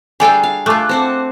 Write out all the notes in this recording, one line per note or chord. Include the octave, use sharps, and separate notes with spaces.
G3 D4 G#4 A4 F5 G5 G#5
F5
A3 F4 A5 D6 F#6
C4 C5 F#5